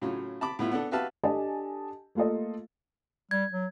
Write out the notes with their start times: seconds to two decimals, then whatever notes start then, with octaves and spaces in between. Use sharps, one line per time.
0.02 A2 C#3 F#3 F4
0.41 A5 B5 D6
0.59 A2 B3 E4 F4
0.71 B3 D4 A4
0.91 F#4 G4 B4 E5 F5 A5
1.24 D4 G4 A4 D#5 G#5 A5
2.15 A3 A#3 F4 A4 D#5
3.31 G3 G#6
3.52 F#3